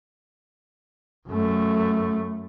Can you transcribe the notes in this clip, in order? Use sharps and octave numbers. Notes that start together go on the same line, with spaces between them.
F#2 A3